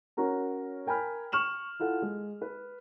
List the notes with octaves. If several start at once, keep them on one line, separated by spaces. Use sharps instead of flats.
C#4 F#4 A#4 A#5
A#4 G5 G#5 B5 F6
C#6 F6 E7 F#7
E4 F4 A4 F#5
G#3
B4